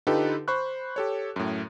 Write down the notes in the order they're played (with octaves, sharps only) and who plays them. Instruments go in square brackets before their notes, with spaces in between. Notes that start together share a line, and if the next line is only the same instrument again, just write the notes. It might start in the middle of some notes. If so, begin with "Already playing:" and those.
[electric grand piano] D3 D#4 F4 G4 A4 B4
C5 B5 C#6 F#6
G4 A4 C#5
F#2 A2